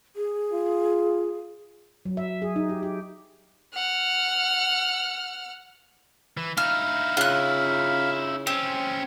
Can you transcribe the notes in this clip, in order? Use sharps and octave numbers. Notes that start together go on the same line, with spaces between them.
G#4
F4
F#3
E5
G#4
D#4
G4
G4
F#5 F6
E3
D#4 E4 F5 F6
C#3 F4 F#6
C4 C#4 G4